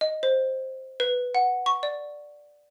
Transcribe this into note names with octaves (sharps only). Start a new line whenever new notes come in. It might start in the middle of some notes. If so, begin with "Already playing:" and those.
D#5
C5
B4
F#5
C#6
D5